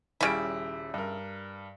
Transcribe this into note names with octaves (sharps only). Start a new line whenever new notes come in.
D#1 C#3 G3 E4 D7
G2 A#4